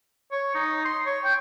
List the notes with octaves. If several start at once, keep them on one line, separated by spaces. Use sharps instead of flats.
C#5
D#4
C6
C#5
G5